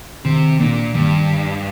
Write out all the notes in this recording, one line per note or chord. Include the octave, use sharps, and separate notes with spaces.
C3 D#3
A#2 A#3 D4
G2 D#3